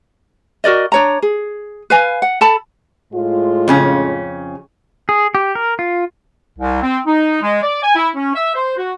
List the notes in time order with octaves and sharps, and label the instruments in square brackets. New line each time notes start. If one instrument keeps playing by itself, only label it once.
[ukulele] F#4 A#4 D5 D#5
D4 C#5 A#5
G#4
B4 F5 G#5
F#5
A4 A5 B5
[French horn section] A2 G#3 F4
[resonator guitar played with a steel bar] F2 C#3 C#4
[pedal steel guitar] G#4
G4
A#4
F4
[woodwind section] C2
C4
D#4
G#3
D5
G#5
E4
C#4
E5
C5
F#4